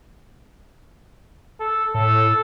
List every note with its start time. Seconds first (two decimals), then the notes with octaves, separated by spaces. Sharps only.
1.60 A4
1.94 A2 A4